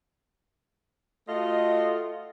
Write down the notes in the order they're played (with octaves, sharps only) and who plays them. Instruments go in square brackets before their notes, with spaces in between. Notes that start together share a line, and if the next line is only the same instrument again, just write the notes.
[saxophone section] A3 F4 F#4 D#5